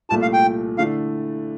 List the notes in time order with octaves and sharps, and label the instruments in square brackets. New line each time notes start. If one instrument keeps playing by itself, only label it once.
[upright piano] C2 A#2 A3 [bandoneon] A5
[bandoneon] F5
G5
[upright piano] D3 A3 E4 [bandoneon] F5